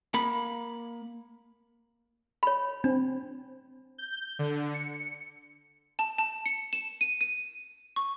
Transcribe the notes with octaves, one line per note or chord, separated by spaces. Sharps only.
A#3 B5
C#5 B5
C4 D4
G6
D3
C#7
A5
A5
C#7
E7
D#7
D#7
C#6